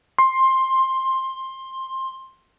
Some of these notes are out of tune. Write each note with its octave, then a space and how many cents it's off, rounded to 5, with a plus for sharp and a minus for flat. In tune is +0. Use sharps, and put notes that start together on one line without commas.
C6 +15